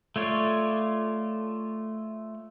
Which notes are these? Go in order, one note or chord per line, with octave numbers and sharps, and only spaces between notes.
A3 F4 C#5 D5